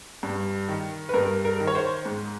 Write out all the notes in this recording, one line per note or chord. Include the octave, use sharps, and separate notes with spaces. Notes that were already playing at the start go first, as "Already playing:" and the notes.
G2
D#3
B4
G2 A#4
A#4
D#3
C#5
C5
G#2